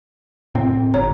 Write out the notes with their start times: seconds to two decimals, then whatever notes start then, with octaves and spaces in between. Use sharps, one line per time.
0.55 A2 C4
0.94 G1 C#5 A#5